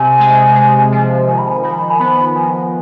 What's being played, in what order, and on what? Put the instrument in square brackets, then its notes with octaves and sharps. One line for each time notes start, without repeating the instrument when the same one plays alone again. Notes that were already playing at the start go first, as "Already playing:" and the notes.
Already playing: [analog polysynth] C3 [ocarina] G#5
[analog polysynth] G#3
G#3
F3
[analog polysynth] D#3 [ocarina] G#5
[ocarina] B5
G#5
[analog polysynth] D#3 [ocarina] B5
[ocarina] G#5
[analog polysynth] B3 [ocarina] B5
[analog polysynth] D#3 [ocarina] G#5